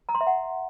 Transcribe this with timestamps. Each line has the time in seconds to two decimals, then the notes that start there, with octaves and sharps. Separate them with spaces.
0.09 A#5
0.15 C6
0.21 E5
0.27 F#5